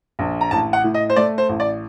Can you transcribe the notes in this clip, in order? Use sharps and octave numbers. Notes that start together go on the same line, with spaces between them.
A#1
A#5
A1 A5
F#5
A2
D#5
C5
A3 D5
C5
A1
D5